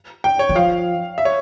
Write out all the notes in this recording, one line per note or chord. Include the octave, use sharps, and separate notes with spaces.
G5
C#5
E3
F3 F5
E5
C#5